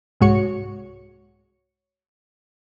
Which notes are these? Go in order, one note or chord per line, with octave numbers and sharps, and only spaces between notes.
C2 G#2 G#3 F#4 C#5 C#7